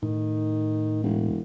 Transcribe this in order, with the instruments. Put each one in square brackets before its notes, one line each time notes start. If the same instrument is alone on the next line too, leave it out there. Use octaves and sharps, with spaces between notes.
[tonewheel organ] A2 [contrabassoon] D#3
[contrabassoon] E1